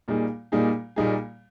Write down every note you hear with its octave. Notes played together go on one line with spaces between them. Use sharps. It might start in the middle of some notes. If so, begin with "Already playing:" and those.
A#2 G3 A#3 D#4 G#4
A#2 G3 A#3 D#4 G#4
A#2 G3 A#3 D#4 G#4